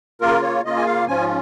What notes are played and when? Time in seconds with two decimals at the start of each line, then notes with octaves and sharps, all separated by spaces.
0.21 C#3 A#3 F4 A#4
0.42 C#5
0.64 C#3 A#3 F4 D#5
0.77 G#5
0.86 F5
1.07 G#2 F3 C#4 F4 G#5